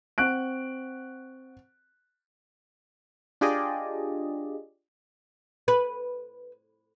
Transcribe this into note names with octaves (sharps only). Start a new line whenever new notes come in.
C4 F#5 C#6 F#6 D7
D4 F4 G4 G#4 D5 D#5
B4